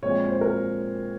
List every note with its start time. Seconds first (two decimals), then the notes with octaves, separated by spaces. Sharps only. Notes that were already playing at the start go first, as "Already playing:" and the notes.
0.02 A#2 F3 G#3 C4 C#5
0.28 C5
0.41 A#4